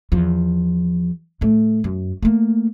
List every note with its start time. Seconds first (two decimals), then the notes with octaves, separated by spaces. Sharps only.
0.12 E2 F3
1.41 A2 A3
1.84 F#2
2.23 A3 A#3